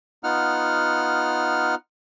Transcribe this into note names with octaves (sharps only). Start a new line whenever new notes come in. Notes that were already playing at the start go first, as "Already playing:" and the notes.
B3 D#4 F4 F#5 F6